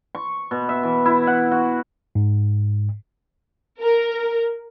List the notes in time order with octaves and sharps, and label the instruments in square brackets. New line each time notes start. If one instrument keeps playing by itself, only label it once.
[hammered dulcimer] C#6
B2
E5
E3
E4
F#5
F#4
[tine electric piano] G#2
[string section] A#4